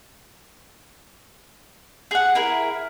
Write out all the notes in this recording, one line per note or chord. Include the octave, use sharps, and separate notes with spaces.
G#4 F#5
E4 G#4 A#4